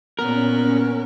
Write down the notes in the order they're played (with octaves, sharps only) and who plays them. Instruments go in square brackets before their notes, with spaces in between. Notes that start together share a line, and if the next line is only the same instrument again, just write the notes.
[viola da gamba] A#2 B3 [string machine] C#4 [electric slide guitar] A#4